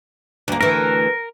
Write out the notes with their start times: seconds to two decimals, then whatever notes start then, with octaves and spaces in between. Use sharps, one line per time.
0.48 D2 A#3
0.61 D2 E3 A#4